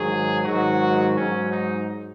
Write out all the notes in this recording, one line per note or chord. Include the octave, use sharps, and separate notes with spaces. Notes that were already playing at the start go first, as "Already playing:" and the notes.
Already playing: G#2 D#3 F#3 G#4
G#2 D#3 F#3 F#4
G#2 F#3 C#4
D#4